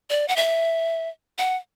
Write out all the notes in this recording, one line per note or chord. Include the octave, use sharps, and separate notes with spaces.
D5
F#5
E5
F#5